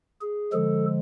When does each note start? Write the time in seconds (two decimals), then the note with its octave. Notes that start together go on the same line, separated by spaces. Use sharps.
0.21 G#4
0.53 D3 F3 G#3 A4